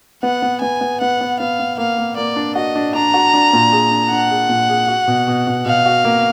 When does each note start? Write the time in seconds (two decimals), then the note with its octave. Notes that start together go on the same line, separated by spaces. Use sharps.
0.23 B3 F#5
0.42 B3
0.62 B3 G#5
0.81 B3
1.01 B3 F#5
1.21 B3
1.40 B3 F5
1.60 B3
1.78 A#3 F5
1.98 A#3
2.17 A#3 D5
2.36 D4
2.55 F#4 D#5
2.76 D4
2.95 D4 A#5
3.14 F#4
3.33 D4
3.53 A#2
3.72 G#4
3.91 D4
4.11 D4 F#5
4.30 G#4
4.50 A#2
4.69 G#4
4.88 F#4
5.08 B2
5.28 B2
5.47 B2
5.66 B2 F5
5.86 F#4
6.05 A#3